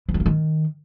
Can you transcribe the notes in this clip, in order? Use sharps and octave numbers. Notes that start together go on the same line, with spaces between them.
E3
G3
A#3
D#3